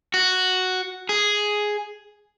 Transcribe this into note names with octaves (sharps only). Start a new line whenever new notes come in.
F#4
G#4